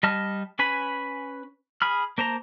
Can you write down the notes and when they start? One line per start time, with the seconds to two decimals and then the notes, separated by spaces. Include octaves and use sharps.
0.03 G3 D#5 A5 F6
0.59 C#4 B4 G#5 B5
1.82 G#4 B5 F6
2.18 A#3 C5 A5 A#5